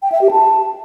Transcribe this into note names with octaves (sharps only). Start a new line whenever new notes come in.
G5
E5
G4
A5